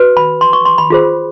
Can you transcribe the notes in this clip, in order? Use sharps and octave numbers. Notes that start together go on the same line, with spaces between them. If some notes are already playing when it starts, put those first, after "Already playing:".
Already playing: F#4 B4
B5
C6
C#6
C6
B5
F4 G#4 C5